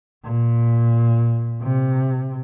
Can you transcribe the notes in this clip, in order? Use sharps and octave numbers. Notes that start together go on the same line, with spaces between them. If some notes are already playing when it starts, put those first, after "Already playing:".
A#2
C3